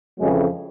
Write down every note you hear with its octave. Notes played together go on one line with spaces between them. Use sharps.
F2 C#3 E3 F#3 G#3